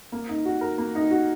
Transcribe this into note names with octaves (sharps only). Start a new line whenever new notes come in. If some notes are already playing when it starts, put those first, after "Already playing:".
A#3
D#4
F#4
A#4
A#3
D#4
F#4